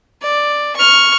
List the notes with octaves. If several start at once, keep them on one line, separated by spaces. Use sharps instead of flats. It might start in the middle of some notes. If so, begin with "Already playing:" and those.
D5
C#6 F6